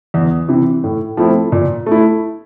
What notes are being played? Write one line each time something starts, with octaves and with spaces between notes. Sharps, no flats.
E2
C3 E3
A2
F3 A3 C4 E4
A#2
A3 E4